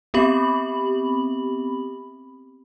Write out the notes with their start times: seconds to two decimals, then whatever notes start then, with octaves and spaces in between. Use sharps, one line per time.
0.14 B3 C4 G4 B5 F#7